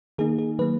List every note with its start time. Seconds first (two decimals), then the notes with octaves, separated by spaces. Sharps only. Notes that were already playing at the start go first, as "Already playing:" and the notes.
0.18 D#3 A#3 D#4 G#4
0.38 G#4
0.59 D#3 F#3 A#3 B4